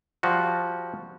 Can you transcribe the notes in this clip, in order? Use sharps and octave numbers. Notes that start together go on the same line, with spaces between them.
F3 G3 F#4